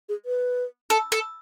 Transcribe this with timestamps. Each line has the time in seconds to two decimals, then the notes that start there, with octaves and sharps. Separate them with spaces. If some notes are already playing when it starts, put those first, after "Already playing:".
0.09 G#4
0.26 B4
0.90 A4
1.12 A4